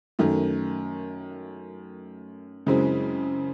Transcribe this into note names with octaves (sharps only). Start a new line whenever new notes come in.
F#2 D#3 A3
F#2 C#3 G#3 C4 E4